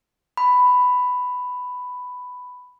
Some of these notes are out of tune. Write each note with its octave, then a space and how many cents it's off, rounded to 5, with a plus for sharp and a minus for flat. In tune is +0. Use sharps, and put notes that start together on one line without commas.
B5 +10